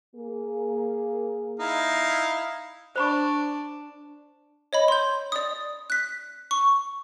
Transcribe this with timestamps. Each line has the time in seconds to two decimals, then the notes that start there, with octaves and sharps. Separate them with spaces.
0.16 A#3 G#4
1.60 D#4 E4 F5
2.96 D4 C5 B5 C#6
4.73 C#5 D#5 B5
4.88 C6 G6
5.32 D5 D#6
5.90 F#6 B6
6.51 C#6